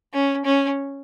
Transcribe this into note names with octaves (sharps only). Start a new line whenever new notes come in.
C#4
C#4